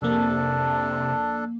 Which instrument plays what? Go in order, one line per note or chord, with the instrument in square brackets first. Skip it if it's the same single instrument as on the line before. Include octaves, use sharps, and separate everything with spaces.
[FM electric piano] F2 A#3 [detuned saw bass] C3 [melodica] D4 A4